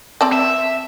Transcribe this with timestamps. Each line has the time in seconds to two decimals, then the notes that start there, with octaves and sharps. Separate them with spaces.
0.21 C4 D5 A5
0.33 E5